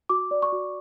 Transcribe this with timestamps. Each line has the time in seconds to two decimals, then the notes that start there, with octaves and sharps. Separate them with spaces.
0.09 F#4 D6
0.31 D5
0.42 C#6
0.52 F#4